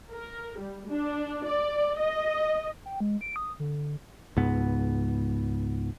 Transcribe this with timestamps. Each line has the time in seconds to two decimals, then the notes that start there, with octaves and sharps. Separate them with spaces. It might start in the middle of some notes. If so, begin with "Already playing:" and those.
0.11 A#4
0.58 G3
0.89 D4
1.46 D5
1.98 D#5
2.86 G5
3.00 G#3
3.21 D7
3.36 D#6
3.59 D3
4.37 C#2 G#2 B3